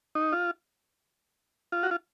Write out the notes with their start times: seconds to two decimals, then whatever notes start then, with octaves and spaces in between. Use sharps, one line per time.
0.15 D#4
0.32 F4
1.72 F4
1.83 F#4
1.91 F4